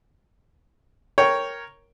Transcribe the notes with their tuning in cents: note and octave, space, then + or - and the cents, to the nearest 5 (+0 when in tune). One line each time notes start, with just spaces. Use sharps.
A#4 +0 C#5 +0 G5 +0